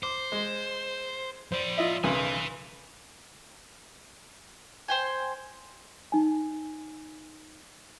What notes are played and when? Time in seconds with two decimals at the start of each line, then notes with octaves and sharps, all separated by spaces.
0.03 C5 D6
0.32 G#3
1.52 F3 C5 D5
1.78 F4 D#5 E5
2.04 B1 F#2 C#3 B4 G#5
4.88 C5 G5 G#5
6.12 D#4 G#5